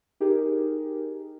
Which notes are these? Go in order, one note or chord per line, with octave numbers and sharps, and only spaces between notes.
D#4 G4 G#4 A#4